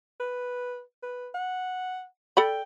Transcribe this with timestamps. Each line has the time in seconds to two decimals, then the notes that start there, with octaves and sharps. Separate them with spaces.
0.20 B4
1.03 B4
1.34 F#5
2.37 A4 D5 G5 B5